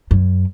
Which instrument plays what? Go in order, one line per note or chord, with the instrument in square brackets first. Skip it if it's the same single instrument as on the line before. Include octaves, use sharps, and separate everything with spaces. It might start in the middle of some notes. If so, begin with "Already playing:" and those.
[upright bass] F#2